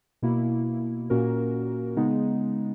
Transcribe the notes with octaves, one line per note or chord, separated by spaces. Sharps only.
B2 A#3 E4
A#2 A#3 C#4 F#4 A#4
C#3 G#3 B3 D#4